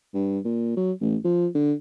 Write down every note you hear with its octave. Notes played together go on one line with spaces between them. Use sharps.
G2
A#2
F#3
A1
F3
D3